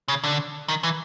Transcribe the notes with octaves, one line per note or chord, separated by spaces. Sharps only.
C#3
D3
D#3
E3